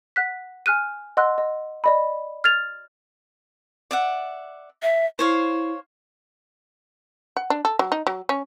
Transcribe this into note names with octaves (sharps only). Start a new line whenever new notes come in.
F#5 F#6 B6
G#5 F6 F#6 D#7
D#5 F#5 C6 E6 F#6
D#5
D5 D#5 B5
F6 G#6 A6 F7
D5 E5 F#5
E5
E4 C5 C#5 F5
F#5
D4
A4
F#3
D#4
F#3
C#4